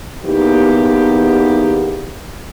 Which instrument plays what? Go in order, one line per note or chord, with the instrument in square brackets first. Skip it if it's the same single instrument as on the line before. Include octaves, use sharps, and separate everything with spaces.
[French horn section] E2 A#3 B3 D#4 G4